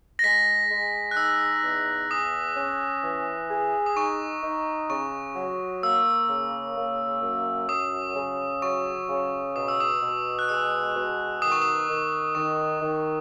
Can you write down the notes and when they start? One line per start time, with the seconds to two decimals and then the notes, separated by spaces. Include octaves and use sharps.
0.19 A#6
0.24 G#3 B6
0.70 G#3
1.11 F#6
1.17 D#4 E6
1.64 E2
2.11 G#4 D#6
2.56 C#4
3.03 E3
3.50 G#4
3.86 D#6
3.96 D#4 C#6
4.43 D#4
4.90 C#3 C#6
5.36 F#3
5.83 A#3 E6
6.29 C#3
6.77 A#3
7.22 F#2
7.69 F#3 D#6
8.15 C#3
8.62 F#3 C#6
9.09 C#3
9.55 B2 D#6
9.68 E6
9.80 D#6
10.02 B2
10.39 F#6
10.49 G#3 E6
10.95 B2
11.42 D#3 D#6
11.52 C#6
11.62 D#6
11.88 D#3
12.35 D#3 C#6
12.82 D#3